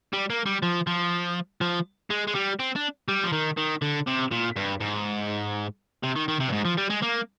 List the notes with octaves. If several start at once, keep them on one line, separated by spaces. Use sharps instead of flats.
G3
A#3
G3
F3
F3
F3
G#3
G#3
G3
C4
D4
G3
F3
D#3
D#3
D3
C3
A#2
G2
G#2
C3
D#3
D#3
C3
G2
G#2
F3
G3
G#3
A#3